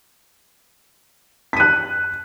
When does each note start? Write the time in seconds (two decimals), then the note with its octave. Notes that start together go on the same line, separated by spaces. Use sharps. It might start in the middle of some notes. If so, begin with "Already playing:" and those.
1.53 B6
1.57 D#7
1.60 F#6